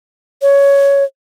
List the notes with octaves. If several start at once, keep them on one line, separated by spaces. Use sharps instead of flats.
C#5